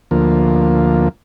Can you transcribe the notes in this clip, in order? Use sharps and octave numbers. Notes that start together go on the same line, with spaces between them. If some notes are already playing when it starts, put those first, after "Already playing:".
D2 F3 A#3